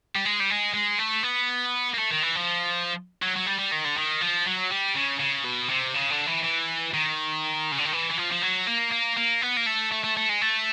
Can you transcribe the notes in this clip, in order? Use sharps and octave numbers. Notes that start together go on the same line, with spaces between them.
G3
G#3
G3
G#3
G#3
A3
B3
A#3
A3
D#3
E3
F3
F#3
F#3
G3
G3
D#3
D3
D#3
F3
F#3
G3
C#3
C#3
B2
C3
C#3
D3
E3
E3
D#3
C#3
D3
D#3
E3
E3
F3
F3
F#3
A#3
A#3
A#3
B3
A#3
A3
A3
A3
A3
G#3
A3